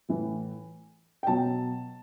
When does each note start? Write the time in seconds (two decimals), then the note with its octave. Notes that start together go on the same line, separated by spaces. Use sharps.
0.09 A2 E3
1.23 G5
1.27 B2 F#3 A5